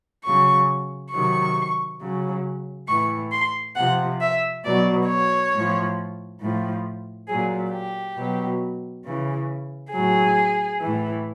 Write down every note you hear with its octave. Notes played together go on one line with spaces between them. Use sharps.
C#3 F#3 C#6
C3 D#3 F#3 C#6
C#3 F#3
A2 E3 C#6
C6
C3 F3 F#5
E5
B2 F#3 D5
C#5
A2 F3
A2 F3
A#2 F#3 G#4
G4
B2 F#3
C#3 E3
A2 F#3 G#4
A2 E3